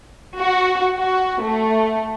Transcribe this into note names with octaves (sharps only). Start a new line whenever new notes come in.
F#4
F#4
A3